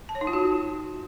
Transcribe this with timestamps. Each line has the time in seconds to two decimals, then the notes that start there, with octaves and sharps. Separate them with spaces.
0.09 A5
0.15 C#5
0.21 D#4
0.27 F4
0.33 F#4